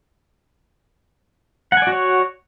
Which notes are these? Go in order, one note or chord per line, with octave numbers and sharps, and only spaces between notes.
F#4 C#5 D5 F#5 G#5